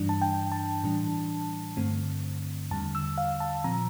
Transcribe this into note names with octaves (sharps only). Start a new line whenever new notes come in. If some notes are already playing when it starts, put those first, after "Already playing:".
Already playing: G2 E3 G3 D4
A5
G5
A5
A2 E3 G3 D4
G2 D3 A3 C4
E2 D3 G3 A5
E6
F5
A5
A#2 F3 C4 A#5